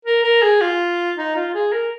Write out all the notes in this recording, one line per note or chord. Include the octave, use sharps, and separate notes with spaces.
A#4
A#4
G#4
F4
D#4
F4
G#4
A#4